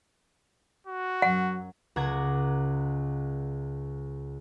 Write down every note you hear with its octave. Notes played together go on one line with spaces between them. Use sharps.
F#4
F#2 F#3 F#5
C#2 F#5 A#5 D6 G#6